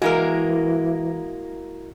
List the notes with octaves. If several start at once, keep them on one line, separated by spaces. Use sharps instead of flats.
E3 G#3 A#3 E4 F#4 A#4